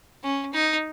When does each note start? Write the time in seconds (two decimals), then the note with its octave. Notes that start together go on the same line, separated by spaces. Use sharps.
0.23 C#4
0.53 D#4